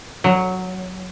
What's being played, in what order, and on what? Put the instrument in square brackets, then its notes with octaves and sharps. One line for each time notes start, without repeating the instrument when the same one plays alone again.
[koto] F#3